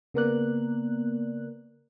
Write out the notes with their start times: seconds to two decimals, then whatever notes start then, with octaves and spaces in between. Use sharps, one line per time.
0.14 C#3 A#3 B3 A#4 D5 F#6